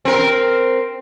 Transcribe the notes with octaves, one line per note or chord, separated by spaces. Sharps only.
C4 A#4